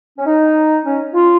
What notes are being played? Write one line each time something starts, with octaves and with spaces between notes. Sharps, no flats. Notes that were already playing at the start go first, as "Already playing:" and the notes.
C#4
D#4
C#4
F4